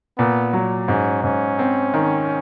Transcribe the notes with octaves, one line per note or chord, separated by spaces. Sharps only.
A#2 B3
F#3
G#2 C#4
G#2 C#4
C4
D#3